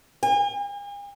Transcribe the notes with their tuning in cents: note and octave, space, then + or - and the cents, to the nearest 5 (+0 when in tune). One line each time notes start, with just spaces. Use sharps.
G#5 -45